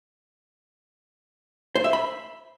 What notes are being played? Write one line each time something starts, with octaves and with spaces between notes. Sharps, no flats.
C5
E5
B5